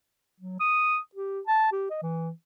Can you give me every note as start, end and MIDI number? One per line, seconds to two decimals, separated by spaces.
0.41 0.59 54
0.60 0.98 87
1.15 1.40 67
1.47 1.71 81
1.72 1.89 67
1.90 1.99 75
2.03 2.31 52